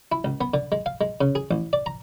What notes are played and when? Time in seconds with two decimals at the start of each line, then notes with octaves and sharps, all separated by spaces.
0.12 E4
0.24 C#2
0.41 B3
0.54 D3
0.72 G#3
0.86 F5
1.01 G#3
1.21 C#3
1.35 G#4
1.51 A1
1.73 D5
1.86 A#5